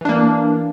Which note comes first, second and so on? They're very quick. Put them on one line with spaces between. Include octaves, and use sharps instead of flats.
E3 D4 A#3